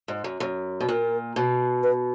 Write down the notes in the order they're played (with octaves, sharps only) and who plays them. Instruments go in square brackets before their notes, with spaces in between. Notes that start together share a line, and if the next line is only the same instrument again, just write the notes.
[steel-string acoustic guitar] G#2
F#2
F#2
B2
[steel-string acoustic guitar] A#2 [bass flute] A#4
[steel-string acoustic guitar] B2
[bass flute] B4